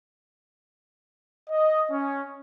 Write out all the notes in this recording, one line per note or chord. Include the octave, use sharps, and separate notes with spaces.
D#5
C#4